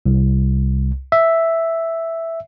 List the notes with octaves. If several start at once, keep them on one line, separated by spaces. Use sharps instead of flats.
C2
E5